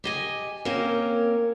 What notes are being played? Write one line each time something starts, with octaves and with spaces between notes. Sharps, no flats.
G4 D#5 G#5
A#3 C4 C#4 A#4